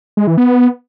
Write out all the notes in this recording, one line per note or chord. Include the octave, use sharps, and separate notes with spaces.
G#3
E3
B3